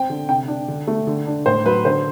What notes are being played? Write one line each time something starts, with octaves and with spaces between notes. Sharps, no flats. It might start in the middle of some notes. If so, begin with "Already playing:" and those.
Already playing: C4 G5
D3
C3 G5
D4
D3
A3
D3
D4
A2 C5
F#3 B4
D3 C5